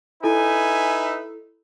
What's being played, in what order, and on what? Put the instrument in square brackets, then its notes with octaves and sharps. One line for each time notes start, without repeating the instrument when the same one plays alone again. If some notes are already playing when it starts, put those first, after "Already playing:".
[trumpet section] D#4 B4 E5 [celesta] E4 A4 [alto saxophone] G#5